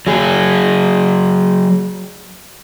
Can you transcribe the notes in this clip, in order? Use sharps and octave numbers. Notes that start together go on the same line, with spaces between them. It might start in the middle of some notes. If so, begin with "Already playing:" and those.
F#3 G#4